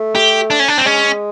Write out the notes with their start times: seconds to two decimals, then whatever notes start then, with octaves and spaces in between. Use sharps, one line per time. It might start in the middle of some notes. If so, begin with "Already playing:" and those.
Already playing: A3
0.15 G4
0.50 D4
0.60 C#4
0.68 D4
0.78 C4
0.86 G#3 C#4